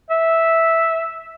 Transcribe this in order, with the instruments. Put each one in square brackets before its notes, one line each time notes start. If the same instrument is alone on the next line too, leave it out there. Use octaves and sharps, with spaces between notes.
[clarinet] E5